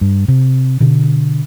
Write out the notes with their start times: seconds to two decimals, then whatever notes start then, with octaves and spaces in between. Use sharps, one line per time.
0.01 G2
0.28 C3
0.80 B2 D3